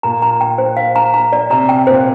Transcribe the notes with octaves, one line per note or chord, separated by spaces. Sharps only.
A#2 A#5
A#5
G5
C5
F5
A#5
A#5
D5
C3 A#5
G5
A#2 C5